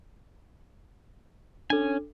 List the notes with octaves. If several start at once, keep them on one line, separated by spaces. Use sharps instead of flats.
C#4 D4 A4 G#5